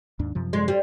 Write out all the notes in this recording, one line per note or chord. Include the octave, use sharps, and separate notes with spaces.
D#2 G#2 D4
F#2 C3 F3
G#3
G3